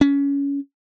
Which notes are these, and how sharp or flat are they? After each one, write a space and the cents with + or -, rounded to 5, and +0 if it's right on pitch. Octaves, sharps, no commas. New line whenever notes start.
C#4 +20